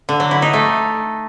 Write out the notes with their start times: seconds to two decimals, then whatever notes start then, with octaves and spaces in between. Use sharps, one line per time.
0.09 D3
0.20 F#3
0.31 E4
0.42 D#4
0.53 A3